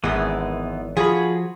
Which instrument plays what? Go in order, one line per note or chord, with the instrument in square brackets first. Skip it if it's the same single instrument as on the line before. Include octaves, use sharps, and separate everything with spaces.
[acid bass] G#1 [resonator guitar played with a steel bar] F#2 G#3 [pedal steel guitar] E3 B3
[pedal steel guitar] F3 F#4 B5 [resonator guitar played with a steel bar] F4 G#4